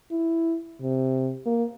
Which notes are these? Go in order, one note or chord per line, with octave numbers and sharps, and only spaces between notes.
E4
C3
A#3